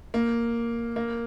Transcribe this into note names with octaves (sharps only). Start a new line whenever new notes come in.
A#3
A#3